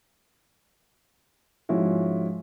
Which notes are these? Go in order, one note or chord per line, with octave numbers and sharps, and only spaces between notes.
G#2 F3 G#3 C#4 E4 F#4